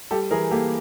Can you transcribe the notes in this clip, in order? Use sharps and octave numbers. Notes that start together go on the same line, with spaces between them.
G3 G4 A4
E3 G#4 A#4
A#3 G4 A4